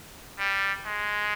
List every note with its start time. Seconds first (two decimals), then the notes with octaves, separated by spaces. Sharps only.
0.39 G3
0.86 G#3